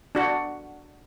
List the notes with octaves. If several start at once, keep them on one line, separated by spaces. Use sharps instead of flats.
D4 F#4 F#5